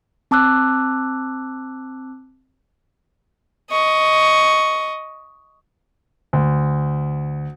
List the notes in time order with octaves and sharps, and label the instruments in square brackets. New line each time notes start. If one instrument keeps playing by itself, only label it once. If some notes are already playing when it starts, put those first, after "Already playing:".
[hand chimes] C4 A5 D6 E6 F#6
[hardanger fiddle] D#5 C#6
[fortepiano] D2